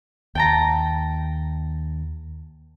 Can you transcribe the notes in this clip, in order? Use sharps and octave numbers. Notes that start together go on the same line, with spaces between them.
D#2 G5 A5 A#5